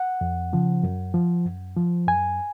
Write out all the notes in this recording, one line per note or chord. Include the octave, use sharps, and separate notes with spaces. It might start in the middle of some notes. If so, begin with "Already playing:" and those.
Already playing: F#5
F2
C#3 F3
F#2
F3
F#2
F3
F#2 G#5